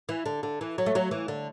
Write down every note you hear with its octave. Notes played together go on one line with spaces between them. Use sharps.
E3
D3
D3
E3
F#3
A3
F#3
E3
D3